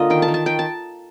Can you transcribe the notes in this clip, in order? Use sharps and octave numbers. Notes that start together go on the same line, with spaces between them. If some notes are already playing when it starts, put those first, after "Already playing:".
Already playing: D3 A#3 F4 D#5
D#3 G5
A5
D#3
A5
D#3 G5
A5